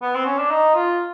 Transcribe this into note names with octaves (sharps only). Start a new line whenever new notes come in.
B3
C4
C#4
D4
D#4
F4